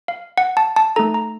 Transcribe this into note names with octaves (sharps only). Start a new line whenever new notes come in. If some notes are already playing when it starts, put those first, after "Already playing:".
F5
F#5
A5
A5
A3 D#4 A4 A#5
A#5